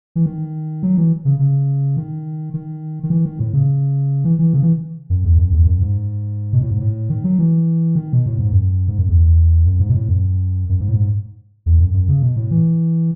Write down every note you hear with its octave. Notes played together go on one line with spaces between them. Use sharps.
E3
D#3
F#3
E3
C#3
C#3
D#3
D#3
D#3
E3
D#3
A2
C#3
E3
E3
C#3
E3
F#2
E2
F#2
E2
F#2
G#2
B2
A2
G#2
A2
D#3
F#3
E3
D#3
B2
A2
G#2
F#2
G#2
F#2
E2
F#2
G#2
B2
A2
F#2
F#2
G#2
A2
G#2
E2
F#2
F#2
C#3
B2
A2
E3